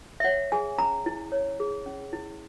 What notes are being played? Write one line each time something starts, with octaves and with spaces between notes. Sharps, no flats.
E5
C#5 F#5
G#4 G#5
C#4 A#5
E4
C#5
G#4
C#4
E4